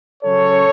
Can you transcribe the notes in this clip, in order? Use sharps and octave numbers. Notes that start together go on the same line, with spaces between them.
C#3 F#3 C#4 A4 C#5